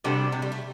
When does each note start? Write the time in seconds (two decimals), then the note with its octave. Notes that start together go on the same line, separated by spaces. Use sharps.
0.04 C3 G3 D4 F#4 A4
0.32 C3
0.42 G3
0.52 A3